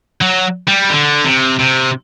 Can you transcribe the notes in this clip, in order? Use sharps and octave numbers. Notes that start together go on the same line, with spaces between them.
F#3
G3
D3
C3
C3